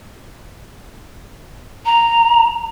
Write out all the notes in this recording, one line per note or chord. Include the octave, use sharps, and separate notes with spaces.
A#5